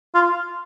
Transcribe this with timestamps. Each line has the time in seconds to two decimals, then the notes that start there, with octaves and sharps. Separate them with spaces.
0.15 F4